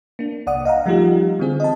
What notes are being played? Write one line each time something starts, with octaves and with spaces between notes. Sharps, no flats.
A#3 D4
C2 D5 F#5 D#6
D#5 F5 F#5 A#5
F3 G3 A3 D#4 F4 G4
D3 E3 C4 G#4
D#5 A5